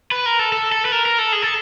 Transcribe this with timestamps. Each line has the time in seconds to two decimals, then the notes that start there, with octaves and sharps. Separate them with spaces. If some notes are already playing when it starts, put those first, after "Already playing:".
0.11 B4
0.26 A#4
0.39 A4
0.52 A4
0.72 A4
0.85 B4
0.92 A#4
1.06 A#4
1.19 A4
1.32 G#4
1.42 A4